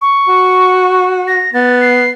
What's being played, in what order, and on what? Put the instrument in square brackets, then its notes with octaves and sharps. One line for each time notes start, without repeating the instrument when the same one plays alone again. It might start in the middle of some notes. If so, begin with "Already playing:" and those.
[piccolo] C#6
[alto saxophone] F#4
[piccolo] A#6
[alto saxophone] B3 [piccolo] A6
[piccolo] C7